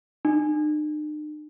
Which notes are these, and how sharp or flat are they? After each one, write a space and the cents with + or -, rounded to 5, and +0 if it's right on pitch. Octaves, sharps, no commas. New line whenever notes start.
D#4 -45